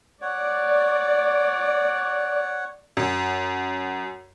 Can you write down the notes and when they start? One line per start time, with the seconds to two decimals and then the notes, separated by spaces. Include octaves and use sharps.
0.22 C#5 D5 F#5
2.97 F#2